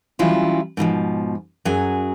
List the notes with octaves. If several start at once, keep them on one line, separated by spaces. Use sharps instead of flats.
E3 F#3 G3 C#4 E4 F4
G#2 B2 E3 F3
F#2 F#3 G#4 G#5